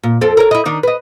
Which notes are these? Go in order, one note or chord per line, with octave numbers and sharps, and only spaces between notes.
A#2
F2 C4 A4
A#4 C#5
E4 D#5
D#3 D4 D#4
B4 D#5